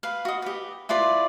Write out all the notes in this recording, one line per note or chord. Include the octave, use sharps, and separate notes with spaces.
B4 F5
F#4 D#5
G4 B4
E4 F4 B4 D5